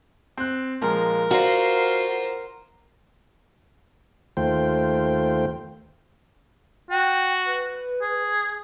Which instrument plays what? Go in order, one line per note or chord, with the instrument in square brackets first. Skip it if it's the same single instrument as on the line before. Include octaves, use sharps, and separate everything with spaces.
[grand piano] C4 F#6
[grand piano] A#2 F3 G#3 [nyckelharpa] A#4
[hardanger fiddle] F4 C5 [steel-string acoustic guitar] F#4 [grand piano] D5 F5 A#5
[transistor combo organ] D#2 A3 F4 C5 G5
[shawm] F#4 [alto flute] G5
[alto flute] B4
[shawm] G#4